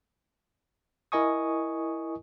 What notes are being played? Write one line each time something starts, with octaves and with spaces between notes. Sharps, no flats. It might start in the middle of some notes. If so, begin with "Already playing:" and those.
E4 A#4 D#5 G#5 C#6 D#6